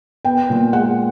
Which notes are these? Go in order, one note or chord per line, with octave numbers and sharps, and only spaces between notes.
B3 G5
A#2
G#3 F#5